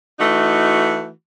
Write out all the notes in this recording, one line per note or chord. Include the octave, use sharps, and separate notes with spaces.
E3 A3 D#4 F#4